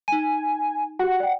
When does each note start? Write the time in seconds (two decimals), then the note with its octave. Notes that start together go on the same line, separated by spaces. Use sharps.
0.08 D#4 G#5 D#7
0.99 F#4 G4 F#5
1.20 D5 G5